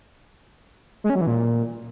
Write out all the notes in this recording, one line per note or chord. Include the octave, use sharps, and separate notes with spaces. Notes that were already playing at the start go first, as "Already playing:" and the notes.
G#3
C#4
F#3
E3
A#2